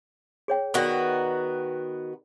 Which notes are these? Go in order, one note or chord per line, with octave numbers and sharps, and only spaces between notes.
G#4 C#5 G5
D#3 B3 F#4 A#4 D5